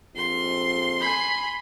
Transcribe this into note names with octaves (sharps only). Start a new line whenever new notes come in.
A#1 F2 C6
G#5 B5